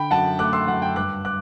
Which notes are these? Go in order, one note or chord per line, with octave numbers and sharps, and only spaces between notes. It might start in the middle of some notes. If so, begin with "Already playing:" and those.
Already playing: D3 G5 B5
F#2 F#5 A5
A3 D6 F#6
C6 E6
F#2 F#5
G5
G2 D6 F#6
D6 F#6